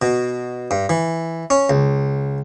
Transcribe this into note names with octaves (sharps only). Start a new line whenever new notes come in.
B2
G2
E3
C#4
C#2